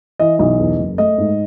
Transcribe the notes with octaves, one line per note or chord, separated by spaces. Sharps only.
E3 D#5
B1 D#5
E2
F#1
A3 D#5
G#2